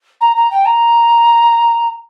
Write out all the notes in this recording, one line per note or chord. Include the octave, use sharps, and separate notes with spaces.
A#5
A#5
G5
A#5